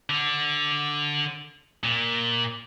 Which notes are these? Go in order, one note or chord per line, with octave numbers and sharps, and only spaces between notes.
D3
A#2